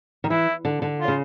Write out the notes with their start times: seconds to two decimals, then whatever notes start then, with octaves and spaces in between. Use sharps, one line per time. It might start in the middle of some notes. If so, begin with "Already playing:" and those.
0.24 D#3
0.30 E3 E4
0.65 D3
0.82 D3
0.99 F4
1.08 C#3